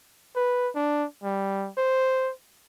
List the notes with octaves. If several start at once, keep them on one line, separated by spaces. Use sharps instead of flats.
B4
D4
G3
C5